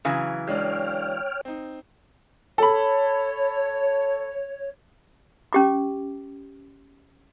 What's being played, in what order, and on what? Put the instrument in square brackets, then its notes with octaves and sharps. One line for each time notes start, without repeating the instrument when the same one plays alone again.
[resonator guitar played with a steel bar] C#3 E3 F#3
[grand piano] G#3 D4 [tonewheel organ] C#5 G5 F6
[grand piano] C4 D#4
[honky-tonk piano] A4 B5 [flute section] C#5
[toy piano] C#4 G4 D6